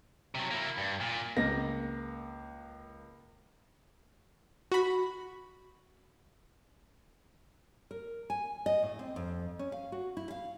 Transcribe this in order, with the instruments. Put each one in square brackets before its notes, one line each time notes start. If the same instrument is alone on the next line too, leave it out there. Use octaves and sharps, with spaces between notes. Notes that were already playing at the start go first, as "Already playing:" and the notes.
[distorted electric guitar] C3 F#3
A#3 E4
G2
A#2
[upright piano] C#2 A#3 A#6
[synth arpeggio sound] F#4 B5
[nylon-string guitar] A#4
G#5
D#5
A2
C4
F2
C#4
F5
F#4
E4
F5